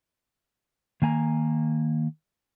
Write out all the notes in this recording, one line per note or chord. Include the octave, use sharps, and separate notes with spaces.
D#3 A#3 G#5 A#5